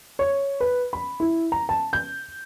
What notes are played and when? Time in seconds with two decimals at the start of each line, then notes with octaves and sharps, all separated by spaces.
0.19 C#5
0.60 B4
0.93 B5
1.20 E4
1.52 A#5
1.69 A5
1.93 G6